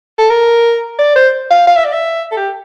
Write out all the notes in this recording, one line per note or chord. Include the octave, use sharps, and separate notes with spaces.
A4
A#4
D5
C5
F5
F5
E5
D5
E5
A4
G4